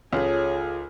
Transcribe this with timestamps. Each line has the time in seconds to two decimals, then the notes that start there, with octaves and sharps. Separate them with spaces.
0.13 C#2 D#4 F4 G#4 A4 C#5 G#5